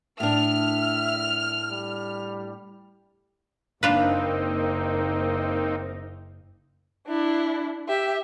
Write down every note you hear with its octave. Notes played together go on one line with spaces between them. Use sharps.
A2 D4 E5 F6
G3
F#1 A#3 C4 D4 D#4 F4 B4
D4 E4
G4 E5